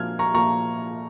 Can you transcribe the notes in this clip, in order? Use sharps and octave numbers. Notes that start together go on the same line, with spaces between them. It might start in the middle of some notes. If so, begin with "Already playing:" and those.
Already playing: A#2 F3 A#3 F6 G#6
A#5 C#6
A#2 F3 A#3 A#5 C#6